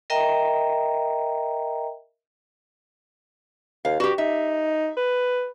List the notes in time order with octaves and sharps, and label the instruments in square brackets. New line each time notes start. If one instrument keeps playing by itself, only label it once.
[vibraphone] A#4 D#5 E5 G5 A#5
[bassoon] D#2 [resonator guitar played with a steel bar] F5
[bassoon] G2 [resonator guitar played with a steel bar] F#4 G4
[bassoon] D#4 [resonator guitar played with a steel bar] E5
[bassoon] B4